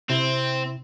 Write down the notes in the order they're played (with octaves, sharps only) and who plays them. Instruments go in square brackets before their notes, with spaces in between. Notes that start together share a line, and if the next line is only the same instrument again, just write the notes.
[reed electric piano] C3 E4 [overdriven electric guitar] C4